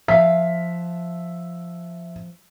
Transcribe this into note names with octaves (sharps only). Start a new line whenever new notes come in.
F3 E5 F5 B6